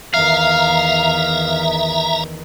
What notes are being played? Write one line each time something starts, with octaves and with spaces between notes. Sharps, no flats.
E2 D#3 E5 F5 A#5